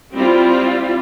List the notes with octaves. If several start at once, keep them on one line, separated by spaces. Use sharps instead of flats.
G3 C4 E4 F4